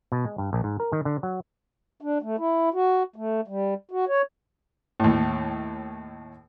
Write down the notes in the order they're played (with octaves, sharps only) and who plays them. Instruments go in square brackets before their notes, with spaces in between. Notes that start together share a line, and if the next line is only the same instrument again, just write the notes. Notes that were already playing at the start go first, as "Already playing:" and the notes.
[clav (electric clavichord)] B2
G#3
G2
A#1
G#2
A#4
D#3
D3
F#3
[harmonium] D4
A3
E4
F#4
A3
G3
F#4
C#5
[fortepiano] D#2 A2